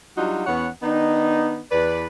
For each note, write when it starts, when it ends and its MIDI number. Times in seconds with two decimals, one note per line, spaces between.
0.18 0.45 54
0.18 0.45 55
0.18 0.45 62
0.18 0.45 63
0.18 0.45 65
0.18 0.45 66
0.46 0.69 40
0.46 0.69 59
0.46 0.69 61
0.46 0.69 73
0.46 0.69 78
0.83 1.62 51
0.83 1.62 59
0.83 1.62 62
0.83 1.62 63
1.72 2.07 40
1.72 2.07 71
1.72 2.07 74